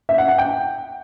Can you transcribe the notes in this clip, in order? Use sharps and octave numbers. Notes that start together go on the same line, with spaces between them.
E5
F#5
F#5
G5